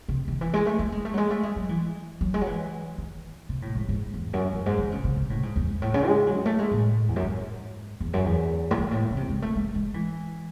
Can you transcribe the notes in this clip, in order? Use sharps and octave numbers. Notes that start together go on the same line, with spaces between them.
C3
D#3
E3
G#3
A3
A3
G#3
A3
F#3
G#3
A3
G#3
F#3
E3
F#3
G#3
F#3
E3
D#3
C3
A2
G#2
G#2
E2
F#2
F#2
G#2
D#3
C#3
C#3
C3
A2
G#2
E2
G#2
A2
C#3
G#3
F#3
A3
G#3
A2
E2
F#2
G#2
E2
F#2
E2
A2
G#2
A2
C#3
C3
G#3
A3
G#3
G#3
E3